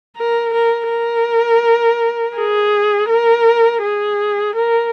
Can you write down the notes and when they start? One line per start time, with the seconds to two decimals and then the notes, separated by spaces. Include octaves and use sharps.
0.17 A#4
0.54 A#4
0.90 A#4
2.37 G#4
3.10 A#4
3.82 G#4
4.55 A#4